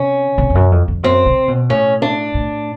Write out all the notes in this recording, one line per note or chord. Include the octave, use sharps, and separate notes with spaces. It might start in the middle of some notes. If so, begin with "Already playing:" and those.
Already playing: C3 C#4
C3
F2
F#2
F2
F2
F#2 C4
C3
B2
A2 C#4
D4
A2